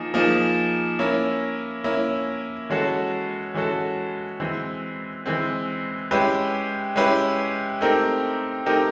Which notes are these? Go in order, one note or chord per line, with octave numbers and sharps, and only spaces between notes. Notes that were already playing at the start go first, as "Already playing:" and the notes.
Already playing: F3 A#3 D#4 G#4
F3 A#3 D#4 G#4
A#3 C#4 E4
A#3 C#4 E4
E3 G#3 C#4 F#4 A4
E3 G#3 C#4 F#4 A4
E3 G#3 C4
E3 G#3 C4
G#3 C#4 E4 G4 B4
G#3 C#4 E4 G4 B4
A3 C4 D#4 G4 A#4
A3 C4 D#4 G4 A#4